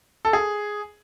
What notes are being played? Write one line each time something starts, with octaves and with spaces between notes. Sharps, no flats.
A4
G#4